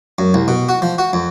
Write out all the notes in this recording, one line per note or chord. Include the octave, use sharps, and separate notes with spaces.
F#2
C2
B2
F#4
F3
F#4
F2